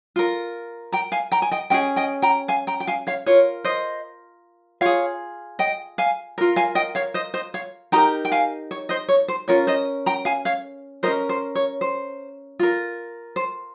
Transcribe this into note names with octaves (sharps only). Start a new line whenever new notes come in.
F4 A#4
G5 A#5
F5 G#5
G5 A#5
G#5
D#5 G5
C#4 G#4 D#5 G5
D#5 G5
G5 A#5
F5 G#5
G5 A#5
G5
F5 G#5
C#5 F5
F4 A#4 C#5
C5 D#5
F4 G#4 C#5 F5
D#5 G5
F5 G#5
F4 A#4
F5 G#5
D#5 G5
C#5 F5
C5 D#5
C5 D#5
C#5 F5
D#4 G4 A#4 G5 A#5
G5
F5 G#5
C#5
C5 D#5
C#5
C5
C#4 F4 A#4 C#5
C5 D#5
G5 A#5
F5 G#5
C#5 F5
C#4 G4 A#4 C5 D#5
C5
C#5
C5
F4 A#4
C5